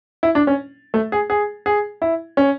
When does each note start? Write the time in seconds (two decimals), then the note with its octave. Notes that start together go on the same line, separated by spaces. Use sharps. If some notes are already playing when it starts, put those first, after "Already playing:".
0.23 E4
0.35 D4
0.47 C#4
0.94 A3
1.12 G#4
1.30 G#4
1.66 G#4
2.02 E4
2.37 C#4